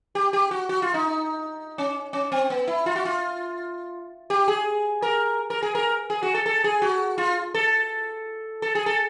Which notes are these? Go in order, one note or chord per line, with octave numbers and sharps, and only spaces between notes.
G4
G4
F#4
F#4
F4
D#4
C#4
C#4
C4
B3
E4
F4
F#4
F4
G4
G#4
A#4
A#4
G#4
A#4
G#4
F#4
A4
A4
G#4
F#4
F4
A4
A4
G#4
A4